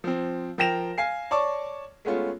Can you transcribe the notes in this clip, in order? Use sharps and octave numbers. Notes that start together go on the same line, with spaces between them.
F3 C4
F3 A#4 G5 A#6 E7 F7
F5 G#5 C7
C#5 D5 A5 C#6 D6
G#3 A3 B3 C#4 F4